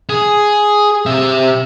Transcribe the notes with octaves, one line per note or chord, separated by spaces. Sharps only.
G#4
C3 E5